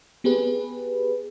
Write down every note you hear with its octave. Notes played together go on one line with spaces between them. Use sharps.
B3 G4 G#4 B4